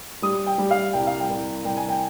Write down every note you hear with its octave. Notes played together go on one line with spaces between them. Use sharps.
G3 D#6
G5
G3
F5
C2 G5
F5
G5
C2
C2 G5
G#5
G5